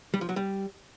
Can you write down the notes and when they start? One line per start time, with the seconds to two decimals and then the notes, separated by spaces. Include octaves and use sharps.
0.14 G3
0.21 F3
0.29 F#3
0.36 G3